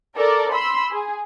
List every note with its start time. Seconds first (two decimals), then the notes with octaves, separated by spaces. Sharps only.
0.16 A4 A#4 D5
0.54 B5 C6 E6
0.92 G#4